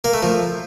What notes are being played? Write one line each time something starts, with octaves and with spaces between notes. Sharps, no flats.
A#3
A3
F3